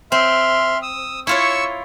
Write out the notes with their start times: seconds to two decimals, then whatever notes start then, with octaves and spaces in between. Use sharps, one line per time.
0.12 C4 E5 C6 F6
0.82 D#6 E6
1.27 E4 F4 C#5 C#6 E6